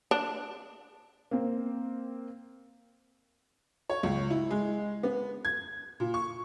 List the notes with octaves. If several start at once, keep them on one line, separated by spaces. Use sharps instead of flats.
D4
A#3 C4
C#5
C#2
E4
G#3
B3
G#6
A#2
C#6